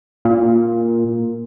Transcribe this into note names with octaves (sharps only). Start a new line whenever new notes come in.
A#2